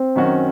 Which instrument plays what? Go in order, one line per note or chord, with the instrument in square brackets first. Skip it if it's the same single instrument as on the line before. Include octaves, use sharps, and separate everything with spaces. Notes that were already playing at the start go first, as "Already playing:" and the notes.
Already playing: [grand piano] C4
[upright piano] F#2 D#3 F#3 C#4 F#4